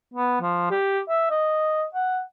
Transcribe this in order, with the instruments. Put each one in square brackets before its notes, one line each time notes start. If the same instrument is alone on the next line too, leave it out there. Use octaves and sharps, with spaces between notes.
[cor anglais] B3
F3
G4
E5
D#5
F#5